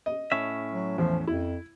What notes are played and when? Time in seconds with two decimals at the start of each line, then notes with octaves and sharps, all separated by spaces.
0.06 D#5
0.32 A2 C#4 E5
0.72 F#3
0.98 E2 F3
1.27 F2 E4